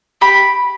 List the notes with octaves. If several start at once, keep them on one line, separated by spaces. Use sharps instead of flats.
G4 B5